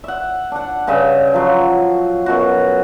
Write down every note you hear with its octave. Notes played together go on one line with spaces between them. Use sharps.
E5 F#5
D4 F#5
G2 C#3 D#5 E5
F3 F#3 C6
F#2 B2 F#4